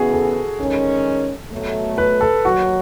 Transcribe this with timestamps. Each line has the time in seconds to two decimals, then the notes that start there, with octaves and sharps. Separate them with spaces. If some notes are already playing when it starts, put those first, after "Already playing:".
Already playing: E2 C#3 E3 B3 F#4 G#4
0.12 A4
0.59 D#3 G#3 C#4
1.51 B2 F#3 A3
1.98 B4
2.21 A4
2.44 D#2 D#3 F#3 F#4